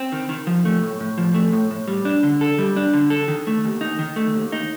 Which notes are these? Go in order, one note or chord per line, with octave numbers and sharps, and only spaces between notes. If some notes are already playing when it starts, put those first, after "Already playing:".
Already playing: C4
D#3
D#3
F3
A3
A2
A2
F3
A3
A2
A2
G3
D4
D3
A4
G3
D4
D3
A4
D#3
A3
D#2
D#4
D#3
A3
D#2
D#4